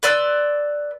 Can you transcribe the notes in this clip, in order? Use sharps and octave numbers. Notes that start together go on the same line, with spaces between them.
B4 D5 C6 E6